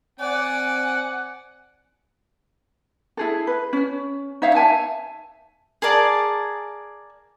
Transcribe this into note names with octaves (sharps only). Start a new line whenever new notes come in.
C4 D5 F#5 G#5
E4 G#4 A4
B4
C#4
D#4 C#5 E5 F5
E5 F#5 G#5 A5
G#4 A#4 D5 A5